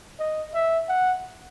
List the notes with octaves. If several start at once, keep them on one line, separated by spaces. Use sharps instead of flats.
D#5
E5
F#5